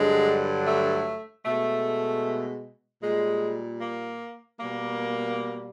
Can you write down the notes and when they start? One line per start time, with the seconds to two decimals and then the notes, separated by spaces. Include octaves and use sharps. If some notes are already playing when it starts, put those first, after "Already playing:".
Already playing: G2 D3 F#3 G#3
0.67 A3
1.45 B2 G#3 A3
3.03 A#2 G3 G#3
3.81 A#3
4.60 B2 G3 A#3